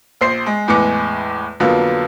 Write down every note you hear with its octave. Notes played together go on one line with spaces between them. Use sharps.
A#1 C5 C7
G#3
E2 A2 G#3 B4 D6 C#7
F2 D3 F#3 A#3 B3